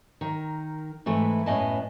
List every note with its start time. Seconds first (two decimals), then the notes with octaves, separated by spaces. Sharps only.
0.21 D#3 A#4
1.06 G#2 E3 A3 E4 B4
1.46 F#2 A2 B3 D#5 G#5 A5